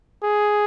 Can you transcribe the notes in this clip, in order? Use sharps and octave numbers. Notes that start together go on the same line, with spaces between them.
G#4